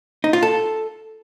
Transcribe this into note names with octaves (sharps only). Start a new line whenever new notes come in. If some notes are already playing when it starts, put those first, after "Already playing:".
D#4
F4
A4